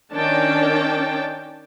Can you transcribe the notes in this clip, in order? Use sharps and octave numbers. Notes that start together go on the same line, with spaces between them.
D#3 C#4 D4 C#5 G5 A5